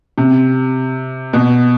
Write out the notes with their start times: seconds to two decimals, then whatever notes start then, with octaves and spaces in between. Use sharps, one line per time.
0.18 C3
1.33 B2